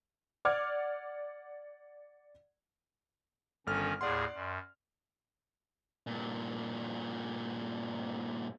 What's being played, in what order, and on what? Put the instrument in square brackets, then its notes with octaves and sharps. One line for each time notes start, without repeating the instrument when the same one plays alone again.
[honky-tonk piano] D5 F#5 D6 F6 G#6
[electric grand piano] G1 A4 F6 [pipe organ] D#3 C#4
[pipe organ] D#2 A2 G#4 [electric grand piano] D5 F#5 C6
[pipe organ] F#2
[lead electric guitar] G2 A#2